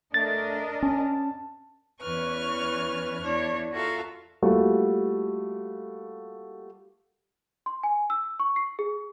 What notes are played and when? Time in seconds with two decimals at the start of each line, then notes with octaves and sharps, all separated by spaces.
0.14 A3 D4 A#4 D#5 A6
0.83 C#4 A5
2.01 E2 E3 C#4 B4 C#6 F6
3.21 E2 D4 E4 C#5
3.70 F4 F#4 A4 A#4 E5 F5
4.42 G3 A3 A#3 F4 F#4
7.66 C6
7.83 G#5
8.10 E6
8.40 C#6
8.56 C7
8.79 G#4